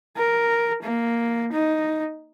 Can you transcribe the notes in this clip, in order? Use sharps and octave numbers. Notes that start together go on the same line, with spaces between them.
A#4
A#3
D#4